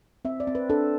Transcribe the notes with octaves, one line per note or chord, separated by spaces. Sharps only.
C4 E5
D5
C4
B4
D4 A4